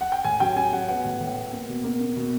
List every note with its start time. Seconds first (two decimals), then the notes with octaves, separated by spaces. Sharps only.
0.01 F#5
0.12 G5
0.24 A2 G#5
0.40 F#3 G5
0.56 F#3 G#5
0.72 F#3 F#5
0.88 B3 F#5
1.05 A2
1.20 A2
1.36 B3
1.53 A#3
1.69 B2
1.84 A#3
2.00 A#3
2.16 B2